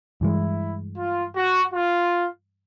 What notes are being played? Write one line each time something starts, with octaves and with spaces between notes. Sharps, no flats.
G2 E3 G#3 E4
F4
F#4
F4